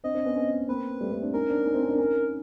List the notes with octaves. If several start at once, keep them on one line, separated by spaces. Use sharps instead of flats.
C4 D4 D#5
C4 D4
B3 C#4
B3 C#4
A#3 C4 B4
G3 A3
G3 A3
C4 D4
C#4 D#4 A#4
C4 D4
C#4 D#4
C4 D4
C#4 D#4
C4 D4
C#4 D#4